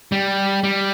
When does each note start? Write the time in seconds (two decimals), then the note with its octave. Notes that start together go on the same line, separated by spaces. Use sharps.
0.12 G3
0.64 G3